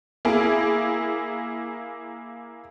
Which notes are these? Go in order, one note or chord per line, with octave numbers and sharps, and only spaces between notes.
A#3 E4 G#4